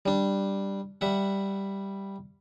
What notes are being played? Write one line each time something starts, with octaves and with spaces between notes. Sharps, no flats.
G3 D4
G3 E5 F#5